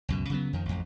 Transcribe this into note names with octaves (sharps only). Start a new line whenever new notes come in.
C#2 F#2 B2
C#3 F#3 B3
F2 D#3
A1 F2